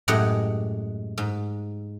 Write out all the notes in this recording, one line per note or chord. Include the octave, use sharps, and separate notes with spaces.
F#2 A2 G#3 G4 D#5 F#5
G#2